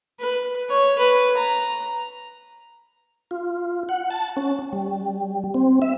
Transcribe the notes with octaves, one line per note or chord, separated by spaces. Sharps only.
B4
C#5
B4
A#5
F4
F#5
A5
C#4
G3
C4
E5